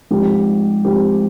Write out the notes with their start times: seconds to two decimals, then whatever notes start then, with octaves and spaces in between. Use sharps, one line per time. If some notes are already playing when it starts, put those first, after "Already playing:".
0.11 G#2 F3 C4 G4
0.85 G#2 F3 C4 G4